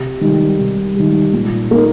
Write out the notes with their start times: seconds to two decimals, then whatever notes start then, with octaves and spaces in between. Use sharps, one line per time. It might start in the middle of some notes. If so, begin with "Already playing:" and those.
Already playing: C3
0.21 D#3 G3
0.59 C3
0.96 D#3 G3
1.33 A#2
1.71 A#3 D#4